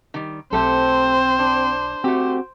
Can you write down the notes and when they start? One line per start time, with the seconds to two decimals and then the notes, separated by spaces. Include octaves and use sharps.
0.14 D#3 G3
0.53 B1 A3 C4 G4 A4 C5
1.39 D4
2.04 A3 C4 F#4 G4